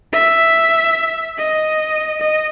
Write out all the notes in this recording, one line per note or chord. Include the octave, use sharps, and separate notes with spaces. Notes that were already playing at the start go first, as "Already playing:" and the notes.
E5
D#5
D#5